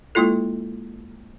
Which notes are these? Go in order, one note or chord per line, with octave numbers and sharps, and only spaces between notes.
G#3 A#3 E4 F4 A4